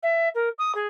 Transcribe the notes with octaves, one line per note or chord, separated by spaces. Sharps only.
E5
A#4
D#6
G#4